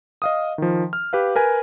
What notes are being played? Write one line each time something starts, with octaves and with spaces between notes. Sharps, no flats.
D#5 F5 D#6
D#3 F3
F6
G4 B4 F5
A#4 B4 G#5